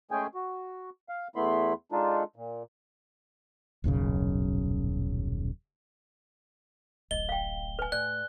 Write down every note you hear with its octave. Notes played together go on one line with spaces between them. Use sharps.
G#3 A3 C#4 G#4 G5 G#5
F#4
F5
E2 A3 B3 E4 B5 C6
G#3 D4 D#4 F4 A4
A#2
D#1 B1 F#2 C#3
D1 A1 D#5 G7
F5 G5
B4 G#5
A2 D5 F#6